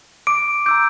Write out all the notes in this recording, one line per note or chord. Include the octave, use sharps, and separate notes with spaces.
D6 D7
A#5 D6 E6 G6 D7